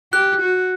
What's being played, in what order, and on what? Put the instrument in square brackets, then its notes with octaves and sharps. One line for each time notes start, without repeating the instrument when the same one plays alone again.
[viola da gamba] G4 [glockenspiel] F#6
[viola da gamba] F#4